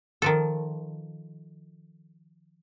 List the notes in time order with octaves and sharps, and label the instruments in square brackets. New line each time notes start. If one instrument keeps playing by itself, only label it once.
[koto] D#3 F3 A4